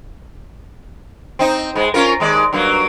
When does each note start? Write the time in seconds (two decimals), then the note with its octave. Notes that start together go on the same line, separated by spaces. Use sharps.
1.39 C4 D#4
1.75 G#2 G#3
1.94 C#4 F4 A#4
2.20 D#2 G#3 D5
2.53 G2 F#3 A#3